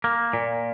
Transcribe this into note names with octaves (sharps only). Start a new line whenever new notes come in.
A#3
A#2